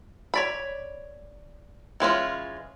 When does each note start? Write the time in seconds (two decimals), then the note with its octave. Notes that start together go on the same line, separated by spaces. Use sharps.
0.34 C#5 D5 B5
2.00 E3 G#3 C#4 F4